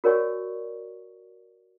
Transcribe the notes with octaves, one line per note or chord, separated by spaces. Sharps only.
F#4 A#4 C#5 D5 G#5 C#6